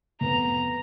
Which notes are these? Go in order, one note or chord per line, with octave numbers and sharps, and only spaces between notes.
F1 B3 A#5